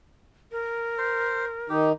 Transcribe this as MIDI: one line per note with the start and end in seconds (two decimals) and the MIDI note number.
0.52 1.69 70
0.98 1.45 72
1.69 1.92 51
1.69 1.92 63
1.69 1.89 67